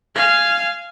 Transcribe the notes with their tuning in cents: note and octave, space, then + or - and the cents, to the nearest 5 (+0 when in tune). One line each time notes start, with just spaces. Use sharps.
F5 -15 G#5 +0